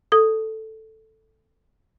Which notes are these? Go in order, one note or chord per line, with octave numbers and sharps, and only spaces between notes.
A4 D#6